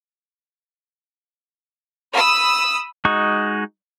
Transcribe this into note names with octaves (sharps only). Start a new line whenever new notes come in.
B5 D#6 E6
G#3 D#4 F#4 C#6